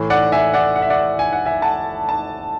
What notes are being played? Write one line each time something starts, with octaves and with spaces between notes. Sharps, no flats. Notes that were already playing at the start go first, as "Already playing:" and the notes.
Already playing: A2 E3
D5 F#5
E5 G#5
D5 F#5
F#5
E5
D5 F#5
G#5
F#5
E5 G#5
F#5 A5
A5